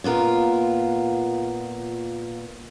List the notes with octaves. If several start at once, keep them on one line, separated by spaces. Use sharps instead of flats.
A#2 B3 F4 A#4